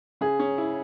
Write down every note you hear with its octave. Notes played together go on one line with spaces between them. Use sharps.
C#3 G#4
C#4
E4